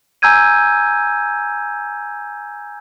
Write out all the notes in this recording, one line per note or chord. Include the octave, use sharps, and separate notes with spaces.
G#5 A#5 E6 G6 G#6 D#7